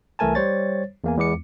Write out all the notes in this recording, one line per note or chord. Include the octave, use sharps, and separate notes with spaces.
C2 E3 A3 A#4 G#5 A5
G3 C5 C#5 A6
E2 A#3 G#5
E2 G#3 B3 D6 C#7